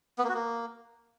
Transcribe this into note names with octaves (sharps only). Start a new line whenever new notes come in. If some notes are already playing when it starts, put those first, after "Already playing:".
B3
A#3
F#4
A#3